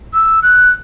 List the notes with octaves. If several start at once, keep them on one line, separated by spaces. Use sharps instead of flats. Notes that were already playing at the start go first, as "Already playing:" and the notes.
E6
F#6